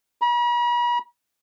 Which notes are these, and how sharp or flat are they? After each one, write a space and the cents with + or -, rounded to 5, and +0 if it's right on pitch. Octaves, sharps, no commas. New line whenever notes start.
B5 -45